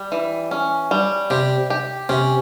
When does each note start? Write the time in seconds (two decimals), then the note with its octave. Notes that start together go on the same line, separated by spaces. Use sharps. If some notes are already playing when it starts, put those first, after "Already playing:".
Already playing: G3
0.12 E3
0.51 C#4
0.91 G3
1.30 C3 G4
1.70 G4
2.09 C3 C#4